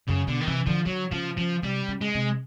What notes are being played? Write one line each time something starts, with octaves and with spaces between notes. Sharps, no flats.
F#2 C#3
B2 D3
D#3
C3 E3
D3 F3
D3 F#3
C#3 F3
C#3 F3
C3 G3
C#3
G#3
C3